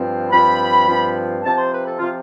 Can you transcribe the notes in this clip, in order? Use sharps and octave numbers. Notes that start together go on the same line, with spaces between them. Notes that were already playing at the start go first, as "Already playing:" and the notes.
Already playing: G2 F3 C4
G2 F3 C4 B5
G2 F3 C4
C3 F3 C4 A5
C5
B4
A4
C3 F3 C4 F4